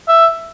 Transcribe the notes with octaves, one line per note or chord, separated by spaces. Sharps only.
E5